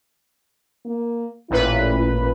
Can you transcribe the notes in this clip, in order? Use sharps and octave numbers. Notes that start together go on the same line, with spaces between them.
A#3
A1 A#2 E4 B4